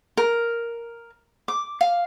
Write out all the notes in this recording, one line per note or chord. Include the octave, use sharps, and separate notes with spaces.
A#4
D6
F5